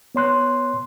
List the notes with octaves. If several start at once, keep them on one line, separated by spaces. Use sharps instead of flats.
B3 C#5 C6 F#6